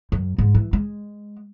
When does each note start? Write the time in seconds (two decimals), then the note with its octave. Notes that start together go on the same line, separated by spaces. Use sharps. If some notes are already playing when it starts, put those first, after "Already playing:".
0.12 F#2
0.38 G#2
0.55 E3
0.73 G#3